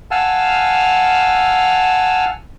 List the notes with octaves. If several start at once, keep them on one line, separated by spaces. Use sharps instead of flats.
F5 F#5 G#5 A5 E6 F6